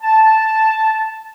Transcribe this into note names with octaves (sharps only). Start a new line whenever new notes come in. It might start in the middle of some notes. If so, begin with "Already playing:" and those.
A5